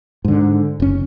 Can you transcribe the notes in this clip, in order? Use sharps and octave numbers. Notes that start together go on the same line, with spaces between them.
G#2 D3
F#1 C#4